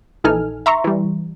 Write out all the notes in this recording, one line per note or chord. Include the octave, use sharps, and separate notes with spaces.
A#1 E3 D#4 A4 G#5 F6
E5 A#5 C6 C#6
E3 G3